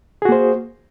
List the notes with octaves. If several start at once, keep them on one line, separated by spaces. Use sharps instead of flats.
A#3 F#4 G#4 C5